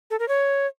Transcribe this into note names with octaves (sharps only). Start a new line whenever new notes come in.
A4
A#4
C#5